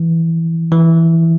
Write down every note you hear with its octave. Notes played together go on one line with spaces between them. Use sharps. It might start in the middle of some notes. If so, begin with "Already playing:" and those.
Already playing: E3
E3